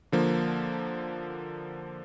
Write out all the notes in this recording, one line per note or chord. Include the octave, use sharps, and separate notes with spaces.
D3 F3 A#3